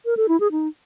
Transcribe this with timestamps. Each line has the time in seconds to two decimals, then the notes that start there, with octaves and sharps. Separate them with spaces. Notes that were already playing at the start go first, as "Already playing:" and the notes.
0.05 A#4
0.17 A4
0.29 E4
0.40 G#4
0.52 D#4